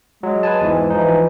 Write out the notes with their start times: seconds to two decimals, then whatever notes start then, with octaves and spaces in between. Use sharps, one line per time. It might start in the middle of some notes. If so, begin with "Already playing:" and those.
0.23 F#3 G#3
0.43 B4 G#5 A5
0.61 E2 G#2 E3
0.90 E3 F3 D#4